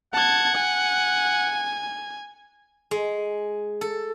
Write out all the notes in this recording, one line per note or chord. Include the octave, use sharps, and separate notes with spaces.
F#5 A5 G#6
G#5
G#3
A4